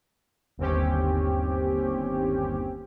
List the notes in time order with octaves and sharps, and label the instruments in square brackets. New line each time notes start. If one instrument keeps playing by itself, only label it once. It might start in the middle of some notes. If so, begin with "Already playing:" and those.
[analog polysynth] G1 D#2 C4 C#4 G4